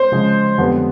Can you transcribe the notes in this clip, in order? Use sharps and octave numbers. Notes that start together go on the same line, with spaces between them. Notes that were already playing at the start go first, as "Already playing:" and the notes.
Already playing: C5 C6
C#3 F3 G#3
F2 D3 G3 B3